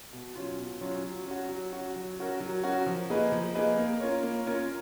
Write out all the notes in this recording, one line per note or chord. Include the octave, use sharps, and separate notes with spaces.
B2
F#3 C#4 F4
B2
F#3 C#4 F4
F#3
C#4 F#4
F#3
C#4 F#4
F#3
C#4 F#4 A#4
F#3
C#4 F#4 A#4
F3
A#3 D#4 G#4 B4
F3
A#3 D#4 G#4 B4
A#3
C#4 F4 A#4 C#5
A#3
C#4 F4 A#4 C#5